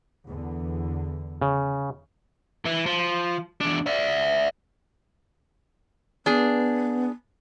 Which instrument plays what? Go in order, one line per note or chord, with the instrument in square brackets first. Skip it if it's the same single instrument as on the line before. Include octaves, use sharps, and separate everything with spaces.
[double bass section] E2 D3
[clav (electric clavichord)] C#3
[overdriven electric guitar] E3
F3
E2 D4
D5 E5
[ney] B3 [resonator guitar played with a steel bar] D4 G#4